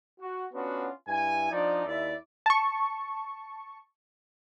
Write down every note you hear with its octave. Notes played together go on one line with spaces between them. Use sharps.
F#4
B3 C#4 D4 F4 F#4
G2 E4 G#5
F3 D4 D#4 D5
D#2 E4 D5 E5
A5 C#6